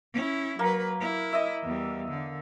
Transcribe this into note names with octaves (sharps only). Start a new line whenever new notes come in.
C#4 E4
F#3 A#3 B4
E4
D#5 E5
E2 G3
D3